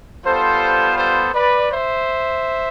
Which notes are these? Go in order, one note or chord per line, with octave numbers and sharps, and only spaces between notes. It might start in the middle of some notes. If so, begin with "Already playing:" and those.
G3 B3 F4 A4 C5
A4 C5
B4 D5
C5 E5